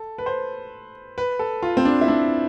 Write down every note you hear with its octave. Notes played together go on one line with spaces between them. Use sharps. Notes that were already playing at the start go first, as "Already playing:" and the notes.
Already playing: A4
B4
C5
B4
A4
F4
C4
D4
E4
D4